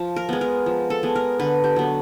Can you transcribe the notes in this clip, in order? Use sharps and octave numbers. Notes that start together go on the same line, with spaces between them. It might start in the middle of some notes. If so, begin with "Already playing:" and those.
Already playing: F3
A#4
G#3 B3
A#4
F3
A4
G#3 B3
A#4
D3 B4
G4
F#3 B3